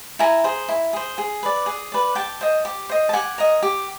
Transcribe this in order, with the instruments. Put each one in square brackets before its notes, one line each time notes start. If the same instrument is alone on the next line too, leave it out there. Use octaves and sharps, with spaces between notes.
[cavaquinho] E4 G#5 A#5
G#4 C5
E4
G#4 C5
G#4
B4 D5
G#4
B4 D5
G4 G5 A5
C5 D#5
G4
C5 D#5
A5
G4 F#5 G#5
A#4 D#5
G4